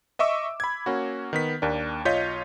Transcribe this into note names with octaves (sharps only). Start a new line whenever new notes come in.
D#5 E5 C#6 D6 E6
B5 G#6
A#3 C#4 F#4
D#3 B3 B6
D#2 A#3 D4
B1 F4 C#5 D#5 G6 B6